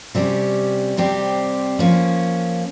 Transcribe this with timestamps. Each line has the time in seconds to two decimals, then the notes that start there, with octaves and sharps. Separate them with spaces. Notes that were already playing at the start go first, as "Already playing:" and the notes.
0.15 C3 G3 C#4 G4
0.97 C3 G3 C4 G4
1.79 F3 A#3 C#4